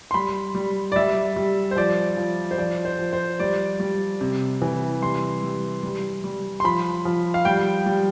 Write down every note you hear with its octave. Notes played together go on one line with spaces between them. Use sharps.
C6
G3 B5
G3
D5
G3 E5
G3
C5
F3 D5
F3
C5
F3 D5
C5
F3
C5
G3 D5
G3
C3
E3
G3 C6
G3
G3
G3
C6
F3 B5
F3
F5
G3 G5
G3